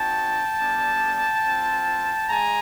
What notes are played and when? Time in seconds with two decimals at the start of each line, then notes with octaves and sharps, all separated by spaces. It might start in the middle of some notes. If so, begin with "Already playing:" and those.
Already playing: C4 D#4 F#4 G5 A5
0.60 G3 B3 D4
1.45 C4 F4
2.29 G#3 G#5 A#5